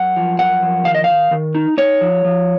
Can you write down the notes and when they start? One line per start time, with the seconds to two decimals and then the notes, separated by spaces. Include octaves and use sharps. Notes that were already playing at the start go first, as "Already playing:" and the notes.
Already playing: F#2 F#5
0.17 F3
0.39 F#2 F#5
0.63 F3
0.85 D#3 F5
0.95 D#5
1.04 D#3 F5
1.31 D#3
1.55 D#4
1.77 D#4 C#5
2.01 F3
2.25 F3